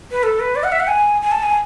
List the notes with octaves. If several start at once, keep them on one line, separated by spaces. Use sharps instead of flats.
B4
A4
B4
D5
F#5
E5
F#5
G#5
G#5
A5
G#5